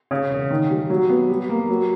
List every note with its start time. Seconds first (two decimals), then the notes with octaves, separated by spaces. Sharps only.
0.11 C#3
0.31 E1
0.50 D#3
0.70 G3
0.90 F#3
1.09 B3
1.29 G3
1.49 A#3
1.69 F#3